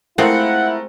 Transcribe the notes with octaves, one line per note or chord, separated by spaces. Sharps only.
G#3 A3 C4 E4 F4 A#4 F#5